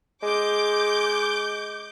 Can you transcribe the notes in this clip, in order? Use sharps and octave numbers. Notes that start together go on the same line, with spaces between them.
G#3 D6 G6